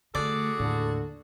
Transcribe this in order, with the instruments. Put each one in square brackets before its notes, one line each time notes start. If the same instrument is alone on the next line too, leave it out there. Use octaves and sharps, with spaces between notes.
[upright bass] D3 A3 [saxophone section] F#4 G#4 A4 [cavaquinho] D5
[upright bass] D#2 A2 [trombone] D3